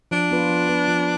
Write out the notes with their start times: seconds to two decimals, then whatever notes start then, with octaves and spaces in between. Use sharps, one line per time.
0.11 F3 D4
0.31 B3 F4 B4
0.49 F3
0.69 B3 F4 B4
0.88 F3